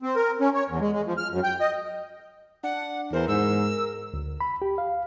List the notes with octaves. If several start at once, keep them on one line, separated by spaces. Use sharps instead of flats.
C4
A#4
C#4
C#5
E2
G#3
G#3
F3
F6
F#2
G5
D#5
D4 F#5
E2 A#4 C5
G#2 E6
D2
B5
G4
F5